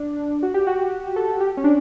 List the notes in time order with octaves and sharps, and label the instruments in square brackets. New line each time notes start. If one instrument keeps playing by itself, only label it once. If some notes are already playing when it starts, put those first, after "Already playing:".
Already playing: [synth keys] D4
F#4
G4
F#4
A4
G4
C#4
D4